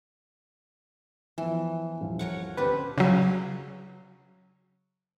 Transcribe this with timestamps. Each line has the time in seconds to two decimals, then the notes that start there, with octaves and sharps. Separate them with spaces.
1.38 E3 F3 B3
2.01 D#1 F3 F5
2.19 A#4 C#5 F#5
2.57 C#2 D3 C4 D4 G4 B4
2.98 C#3 F#3